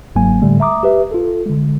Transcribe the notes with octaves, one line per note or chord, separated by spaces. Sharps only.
G1 G#2 F#3 A#3 G#5
A2 D3 G3 A3
E5 A#5 D6 D#6
G4 B4 E5
F4 A4
D3 G#3